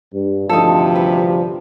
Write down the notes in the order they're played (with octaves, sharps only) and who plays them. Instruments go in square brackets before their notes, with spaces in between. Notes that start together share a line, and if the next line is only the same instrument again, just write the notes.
[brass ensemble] G2
[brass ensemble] A1 D2 G2 [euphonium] C3 [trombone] F3 [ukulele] D#4 A4
[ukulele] B4